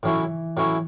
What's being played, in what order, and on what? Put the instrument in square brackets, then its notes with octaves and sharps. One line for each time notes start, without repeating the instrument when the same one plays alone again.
[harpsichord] A2 F#3 C#4 E4 [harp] E3
[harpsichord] A2 F#3 C#4 E4